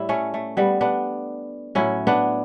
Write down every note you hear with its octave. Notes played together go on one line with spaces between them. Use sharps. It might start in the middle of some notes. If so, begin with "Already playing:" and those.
Already playing: A2 G3 E4
A3 C#4
A3
G3 B3
B3 D4
A2 F#3 C#4 E4
B3 D4